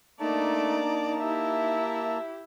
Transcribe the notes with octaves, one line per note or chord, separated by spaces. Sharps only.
A3 A#3 D4 D#4 D5 A5 A#5
E4 G4 E5